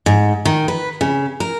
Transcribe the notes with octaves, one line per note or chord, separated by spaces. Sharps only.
G#2
D#3
B4
C#3
A#4